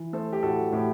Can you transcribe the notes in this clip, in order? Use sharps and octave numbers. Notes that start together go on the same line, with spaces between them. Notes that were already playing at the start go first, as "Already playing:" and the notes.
Already playing: E3
A3 A4 C5
G4
A2 F#4 A4
A2 G4